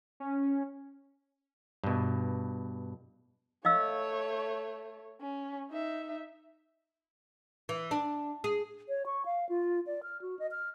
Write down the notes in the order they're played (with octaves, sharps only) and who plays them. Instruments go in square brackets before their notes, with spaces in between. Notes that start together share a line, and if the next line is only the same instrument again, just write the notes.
[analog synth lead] C#4
[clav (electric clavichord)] G2 B2
[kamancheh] A3 C#5 [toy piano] D#5 F5 E6
[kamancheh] C#4
D#4 E5
[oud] E3
D4
G#4
[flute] C#5
C#6
F5
F4
D5
F6
F#4
D#5
F6